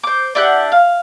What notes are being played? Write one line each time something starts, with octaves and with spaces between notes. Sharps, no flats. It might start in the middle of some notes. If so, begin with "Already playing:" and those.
C5 D6
D4 E4 G4 F#5
F5